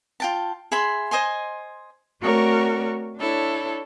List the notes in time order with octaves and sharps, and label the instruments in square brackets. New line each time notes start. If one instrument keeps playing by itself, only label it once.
[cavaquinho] F4 G5 A5
G#4 E5 B5 C6
C5 D#5 G#5 C6
[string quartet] A3 C4 F#4 A#4 C#5 D5
D4 E4 A4 C#5